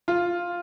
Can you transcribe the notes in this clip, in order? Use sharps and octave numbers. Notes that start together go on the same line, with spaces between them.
F4